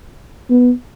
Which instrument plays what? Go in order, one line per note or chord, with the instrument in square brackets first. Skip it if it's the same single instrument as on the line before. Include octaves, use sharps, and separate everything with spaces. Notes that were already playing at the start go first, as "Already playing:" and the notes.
[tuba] B3